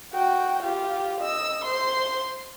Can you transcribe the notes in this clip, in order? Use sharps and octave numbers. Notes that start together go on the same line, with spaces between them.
F#4 G5
F4 G4
D#5 E6
C5 C6